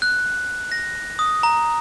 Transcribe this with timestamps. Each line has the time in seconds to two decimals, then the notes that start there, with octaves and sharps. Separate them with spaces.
0.02 F#6
0.72 A#6
1.19 D#6
1.43 A#5